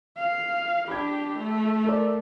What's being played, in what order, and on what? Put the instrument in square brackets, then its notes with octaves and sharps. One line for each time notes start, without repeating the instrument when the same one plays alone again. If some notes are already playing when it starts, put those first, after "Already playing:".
[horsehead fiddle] F5
[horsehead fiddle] D4 G4 [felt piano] B5 G#6
[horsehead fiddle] A3
[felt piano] A4 A#4 D5